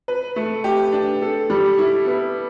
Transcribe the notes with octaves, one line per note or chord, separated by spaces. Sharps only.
B4
A3
G4
D4
A4
G3
E4
B3